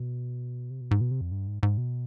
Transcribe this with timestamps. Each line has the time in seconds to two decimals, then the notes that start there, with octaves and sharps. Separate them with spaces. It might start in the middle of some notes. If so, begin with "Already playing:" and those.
Already playing: B2
0.70 C3
0.81 B2
0.91 G#2
1.01 B2
1.11 C3
1.21 F2
1.32 G2
1.47 G#2
1.63 G#2
1.77 B2